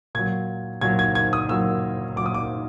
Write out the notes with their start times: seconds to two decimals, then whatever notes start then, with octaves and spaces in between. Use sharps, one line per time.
0.15 A#2 F#3 G#6
0.81 A#2 F#3 G#6
0.99 G#6
1.15 G#6
1.33 D#6
1.49 A#2 F#3 E6
2.16 A#2 F#3 D6
2.26 D#6
2.34 D6